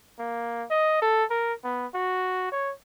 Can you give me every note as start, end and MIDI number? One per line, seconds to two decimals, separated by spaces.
0.19 0.65 58
0.71 1.02 75
1.02 1.24 69
1.31 1.53 70
1.64 1.86 59
1.94 2.50 66
2.52 2.72 73